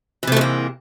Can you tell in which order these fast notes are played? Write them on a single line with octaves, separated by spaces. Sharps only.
E3 C3 A3 G#2 A#3